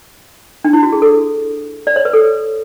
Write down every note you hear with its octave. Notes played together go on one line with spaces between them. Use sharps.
D4
E4
F#4
G#4
A4
D5
C#5
B4
A4